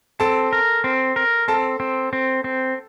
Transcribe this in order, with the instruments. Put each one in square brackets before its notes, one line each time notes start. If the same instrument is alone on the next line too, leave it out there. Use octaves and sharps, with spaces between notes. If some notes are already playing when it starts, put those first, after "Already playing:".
[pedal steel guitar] C4 [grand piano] A4 A5
[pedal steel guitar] A#4
C4
A#4
[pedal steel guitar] C4 [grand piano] A4 A5
[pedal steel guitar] C4
C4
C4